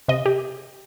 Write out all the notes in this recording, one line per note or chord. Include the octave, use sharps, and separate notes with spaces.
C3 D#5
G4